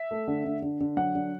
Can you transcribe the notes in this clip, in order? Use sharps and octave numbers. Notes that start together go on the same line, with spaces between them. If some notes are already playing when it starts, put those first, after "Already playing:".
Already playing: E5
A3
D3
D3
D3
D3
F#3 F#5
D3